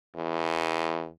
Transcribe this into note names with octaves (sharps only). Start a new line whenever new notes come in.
E2